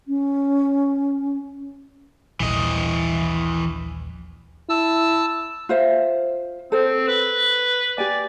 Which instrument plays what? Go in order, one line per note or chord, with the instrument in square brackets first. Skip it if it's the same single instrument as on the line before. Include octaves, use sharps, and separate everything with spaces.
[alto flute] C#4
[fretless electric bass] D#1 A#1 [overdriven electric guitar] E3 D#5
[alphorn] E4 [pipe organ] A5 E6
[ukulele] F4 C5 E5
[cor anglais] C4 [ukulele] A4 C5
[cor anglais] B4
[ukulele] G4 G#5 [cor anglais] D5